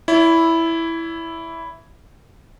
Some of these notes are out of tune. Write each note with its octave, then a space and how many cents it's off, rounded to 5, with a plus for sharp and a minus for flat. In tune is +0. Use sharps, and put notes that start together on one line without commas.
E4 +0 C#5 +45